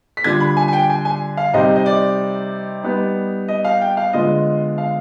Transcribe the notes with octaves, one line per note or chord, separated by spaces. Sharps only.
B6
D3 G3 D4 F4 G#6
B5
G#5
G#5
G5
G#5
G#5
F5
C3 G3 C4 D#4 D#5
D#5
D5
G3 B3 D#4
D#5
F5
G5
F5
D3 G#3 B3 F4 D#5
F5